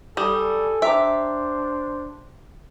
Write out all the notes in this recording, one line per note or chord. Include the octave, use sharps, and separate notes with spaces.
G3 G4 A4 G#5 D#6
D4 C5 E5 G5 A#5 D6